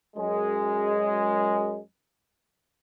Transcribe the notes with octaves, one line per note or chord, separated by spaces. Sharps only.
F#2 G#3